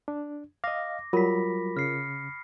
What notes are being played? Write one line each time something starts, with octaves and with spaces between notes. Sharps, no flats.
D4
D#5 F5 D6 A#6
F#3 G3 F4 A#4 B5 B6
C#3 F6 C7 C#7